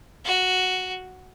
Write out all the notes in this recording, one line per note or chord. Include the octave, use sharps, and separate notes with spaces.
F#4